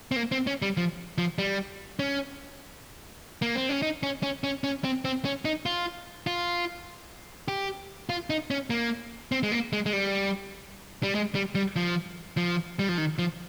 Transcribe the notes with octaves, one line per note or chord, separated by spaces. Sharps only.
C4
A#3
C4
C#4
G3
F3
F3
G3
C#4
A#3
C4
C#4
D#4
C#4
C#4
C#4
C#4
C4
C4
C#4
D#4
F4
F4
G4
F4
D#4
C#4
A#3
C4
G#3
A#3
G#3
G#3
G3
G3
G#3
G3
G3
F3
F3
G3
F3
D#3
F3